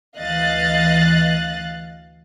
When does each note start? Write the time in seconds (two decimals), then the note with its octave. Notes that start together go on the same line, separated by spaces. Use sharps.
0.16 D2 E3 D#5 F5 F#6 A6